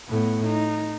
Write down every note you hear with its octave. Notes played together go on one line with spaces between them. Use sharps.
A2 B3
D#4